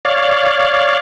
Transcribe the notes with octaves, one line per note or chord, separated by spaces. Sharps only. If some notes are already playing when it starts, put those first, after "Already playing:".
C#5 D5 F5